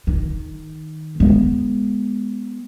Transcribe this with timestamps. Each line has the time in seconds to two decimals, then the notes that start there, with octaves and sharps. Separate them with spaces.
0.07 D#3
1.20 G#3 B3